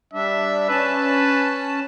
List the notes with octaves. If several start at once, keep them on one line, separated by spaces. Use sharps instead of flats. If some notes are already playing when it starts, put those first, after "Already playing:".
G3 D4 E5
C#4 B4 A5